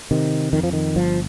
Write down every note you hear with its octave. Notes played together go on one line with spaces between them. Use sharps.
C3 D#3
F2 D#3
F3
D#3
G1 F3